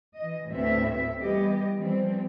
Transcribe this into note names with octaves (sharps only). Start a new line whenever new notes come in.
E3 D#5
D2 A2 B3 C4 E5
E3 G3 B3 G4 D#5
E3 F3 G3 C4